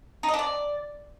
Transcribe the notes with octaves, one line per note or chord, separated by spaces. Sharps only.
D#4
D#5
D4
D5